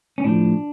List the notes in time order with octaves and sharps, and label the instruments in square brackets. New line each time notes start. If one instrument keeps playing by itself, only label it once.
[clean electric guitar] C#4
A2 F3 D4